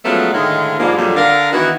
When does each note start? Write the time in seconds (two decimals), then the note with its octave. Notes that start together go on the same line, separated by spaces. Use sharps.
0.05 F3 F#3 G#3 A3 B3 C#4
0.34 A2 D3 D#3 G#3 D#4 F5
0.79 G#2 F3 G3 G#3 A#3
0.98 F2 A#2 D3 D#3 F#3 G3
1.16 D3 A#4 F5
1.53 D#3 E3 B3 F#4